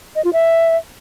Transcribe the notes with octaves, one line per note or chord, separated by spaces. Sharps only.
D#5
F4
E5